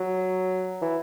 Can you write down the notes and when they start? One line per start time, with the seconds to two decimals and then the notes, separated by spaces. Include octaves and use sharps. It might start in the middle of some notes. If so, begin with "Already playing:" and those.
Already playing: F#3
0.82 E3